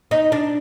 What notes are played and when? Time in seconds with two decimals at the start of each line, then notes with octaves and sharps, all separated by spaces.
0.11 D#4
0.32 D4